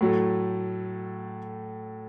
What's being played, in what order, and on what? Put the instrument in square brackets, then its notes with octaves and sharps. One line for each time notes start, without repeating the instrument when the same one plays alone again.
[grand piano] A2 F#3 A3